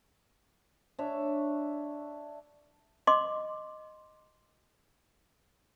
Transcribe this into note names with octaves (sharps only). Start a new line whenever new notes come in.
D4 C#5 E5
D#5 C6 D6